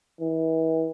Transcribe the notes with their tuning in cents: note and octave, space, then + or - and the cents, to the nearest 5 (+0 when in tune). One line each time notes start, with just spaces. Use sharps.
E3 -35